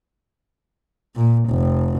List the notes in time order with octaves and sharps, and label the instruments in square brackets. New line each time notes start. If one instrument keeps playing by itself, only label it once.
[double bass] A#2
F1